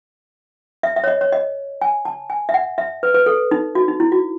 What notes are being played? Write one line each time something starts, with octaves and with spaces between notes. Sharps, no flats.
E5
E5
C#5
D#5
C#5
D#5
G#5
A5
G#5
E5
F#5
E5
B4
B4
A4
D#4
F#4
D#4
E4
F#4